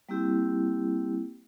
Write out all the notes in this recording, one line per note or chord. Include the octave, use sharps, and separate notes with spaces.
G3 A#3 C4 E4 G4